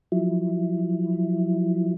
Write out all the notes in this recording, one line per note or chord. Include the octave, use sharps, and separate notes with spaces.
F3 F#3 E4